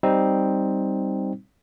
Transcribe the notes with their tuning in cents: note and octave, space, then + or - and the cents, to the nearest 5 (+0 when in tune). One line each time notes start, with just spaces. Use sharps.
G3 +0 C4 +0 D#4 +5